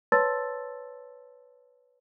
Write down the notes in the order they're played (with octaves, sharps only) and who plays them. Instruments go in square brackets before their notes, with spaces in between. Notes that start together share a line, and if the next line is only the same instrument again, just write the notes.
[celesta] B4 C#5 A5 C6 E6 A6